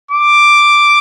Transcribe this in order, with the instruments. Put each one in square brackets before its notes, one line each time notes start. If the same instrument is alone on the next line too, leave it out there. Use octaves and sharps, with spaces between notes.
[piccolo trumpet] D6